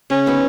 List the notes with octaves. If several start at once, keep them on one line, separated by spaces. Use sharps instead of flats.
C#3 C#4
F#3 B3 D#4